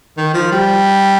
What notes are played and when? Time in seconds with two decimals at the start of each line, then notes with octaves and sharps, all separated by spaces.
0.17 D#3
0.34 F3
0.52 G3